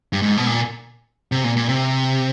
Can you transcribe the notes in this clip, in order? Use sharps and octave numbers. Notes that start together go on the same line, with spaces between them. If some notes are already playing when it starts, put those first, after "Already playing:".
G2
G#2
B2
A#2
C3
A#2
A#2
C3